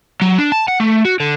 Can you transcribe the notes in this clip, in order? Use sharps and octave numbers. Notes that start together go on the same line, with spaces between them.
F#3
D4
A5
F#5
A3
F#4
D3